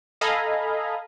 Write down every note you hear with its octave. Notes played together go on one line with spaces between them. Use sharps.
A4 D#5 F5 G#5 A#5 B5